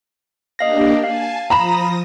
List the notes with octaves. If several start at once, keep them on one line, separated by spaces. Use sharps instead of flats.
A#3 D4 G4 D#5 F5 A#6
F5 G#5 A5
F3 A#5 B5 D#6 A#6 E7